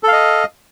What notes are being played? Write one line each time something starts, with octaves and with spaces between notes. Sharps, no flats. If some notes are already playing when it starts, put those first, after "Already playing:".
A4 D#5 F5